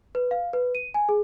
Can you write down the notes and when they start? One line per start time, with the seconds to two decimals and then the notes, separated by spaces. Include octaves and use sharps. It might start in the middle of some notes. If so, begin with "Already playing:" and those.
0.15 B4
0.31 F5
0.53 B4
0.75 D#7
0.94 G#5
1.09 G#4